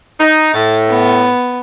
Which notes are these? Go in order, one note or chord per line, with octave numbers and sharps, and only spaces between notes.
D#4
A2 A6
B3